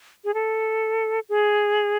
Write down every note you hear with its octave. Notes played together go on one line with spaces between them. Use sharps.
G#4
A4
G#4